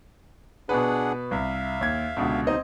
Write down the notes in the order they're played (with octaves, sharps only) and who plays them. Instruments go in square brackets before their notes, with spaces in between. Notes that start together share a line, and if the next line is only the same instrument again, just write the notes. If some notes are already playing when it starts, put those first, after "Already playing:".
[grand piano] B2 B4 [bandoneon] D4 G#4 F#5
[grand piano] C2 [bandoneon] E5 F5
[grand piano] D#2 G#6
C#2 B2 D3
[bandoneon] D#2 D#4 [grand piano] C4 D#5